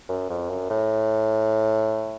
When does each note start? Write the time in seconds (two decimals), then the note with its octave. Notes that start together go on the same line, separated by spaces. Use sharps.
0.09 F#2
0.30 F2
0.50 F#2
0.70 A2